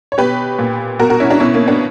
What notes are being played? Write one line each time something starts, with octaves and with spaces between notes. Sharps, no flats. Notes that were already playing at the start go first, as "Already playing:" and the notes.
C#5
B2 G4 B4
A#2
B2 F#4 A#4
F#4 A#4
C#4 E4
D4 F#4
B2 C#4 E4
A#3 C#4
B3 D4